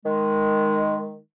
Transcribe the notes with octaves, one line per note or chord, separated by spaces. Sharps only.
D#3 G#3